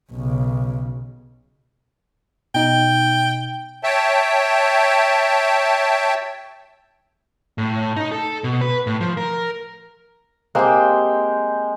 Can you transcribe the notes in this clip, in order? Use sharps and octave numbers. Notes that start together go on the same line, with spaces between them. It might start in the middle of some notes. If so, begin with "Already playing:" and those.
B1 C#3
B2 D#4 G5
C#5 E5 G5 A5
A2
D#4
A4
B2
B4
A2
F3
A#4
G#3 A#3 C4 G4 G5